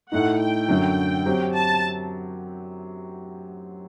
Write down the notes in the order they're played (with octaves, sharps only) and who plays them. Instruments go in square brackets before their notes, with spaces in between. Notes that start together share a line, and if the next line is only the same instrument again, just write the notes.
[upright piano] A2 A3 D#4 [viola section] F#5
[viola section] G5
[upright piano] F#2 D3 F#3
F#3 C4 G4
[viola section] A5